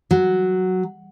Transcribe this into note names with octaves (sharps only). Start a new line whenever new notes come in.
F#3